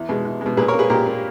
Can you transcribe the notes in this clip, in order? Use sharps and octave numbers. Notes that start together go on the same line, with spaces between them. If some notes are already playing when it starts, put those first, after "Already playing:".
Already playing: E2
B2 G#3
E2
B2 G#3
A#2 G#4 B4
A#4 C#5
A#3
G#4 B4
A#2 G4 A#4
A#3